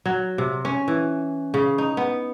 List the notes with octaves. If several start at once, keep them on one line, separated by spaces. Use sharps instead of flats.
F#3
C3
C#4
E3
C#3
D#4
B3